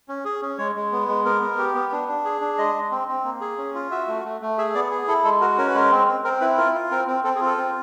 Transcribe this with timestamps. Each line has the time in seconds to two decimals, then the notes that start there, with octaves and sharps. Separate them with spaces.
0.09 C#4
0.25 G#4
0.42 C#4
0.58 G#3 C#5
0.75 G#3
0.92 B3
1.08 G#3
1.25 B3 A#4
1.42 B3
1.58 G4
1.75 B3
1.92 D4
2.08 D4
2.25 G#4
2.41 D4
2.58 G#3 D#5
2.75 G#3
2.91 C4
3.08 C4
3.25 A#3
3.41 G#4
3.58 C#4
3.74 F4
3.91 F#4 E5
4.08 A3
4.25 A3
4.41 A3
4.58 G#4 E5
4.75 B3 D5
4.91 G#4
5.08 E4 A4
5.24 G#3 A4
5.41 F#4 A#4
5.58 C#4 A#4
5.67 B4
5.74 G#3 A#4
5.91 C4
6.08 C4
6.24 C4 A#4
6.41 E4 B4
6.58 F4 A#4
6.74 F4
6.91 C4 A#4
7.08 C4
7.24 C4 A4
7.36 G#4
7.41 F4
7.46 A4
7.58 C4